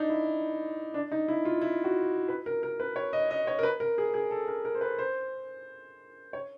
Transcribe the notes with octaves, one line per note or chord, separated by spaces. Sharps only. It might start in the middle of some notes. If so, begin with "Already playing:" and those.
Already playing: D4 D#4
E4
D4
D#4
E4
F4
E4
F#4
B4
A#4
A#4
B4
C#5
D#5
D#5
C#5
A#4
B4
A#4
G#4
G#4
A4
A#4
A#4
C5
B4
C5
C#5